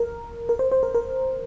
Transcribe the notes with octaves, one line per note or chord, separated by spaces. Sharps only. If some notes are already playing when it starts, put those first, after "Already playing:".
Already playing: A#4
A#4
C5
C5
A#4
A#4